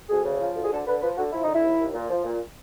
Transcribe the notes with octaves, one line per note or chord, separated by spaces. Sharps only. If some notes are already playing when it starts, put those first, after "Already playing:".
D2 G#4
C#3
F3
D2
G#4
D3 A4
D3 B4
F3 B4
D3 F#4
F3 E4
D3 D#4
E4
D#2
D#2
A#2
F3
A#2